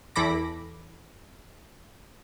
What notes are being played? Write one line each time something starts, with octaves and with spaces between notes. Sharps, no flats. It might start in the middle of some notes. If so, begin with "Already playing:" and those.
E2 E3 A4 B5 D6 A#6